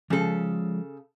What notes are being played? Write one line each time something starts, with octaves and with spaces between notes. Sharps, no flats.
C#3 F3 G#3 A4